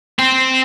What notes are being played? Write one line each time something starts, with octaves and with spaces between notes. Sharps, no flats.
C4